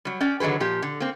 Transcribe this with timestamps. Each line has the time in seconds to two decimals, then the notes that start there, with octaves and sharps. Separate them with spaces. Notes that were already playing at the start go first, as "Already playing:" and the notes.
0.05 F#3 G3
0.20 C#4 D5 G5
0.40 D3 D#3 F#3 G#4 B4
0.60 A#2 F3 G4
0.82 D3
1.00 A#3 C4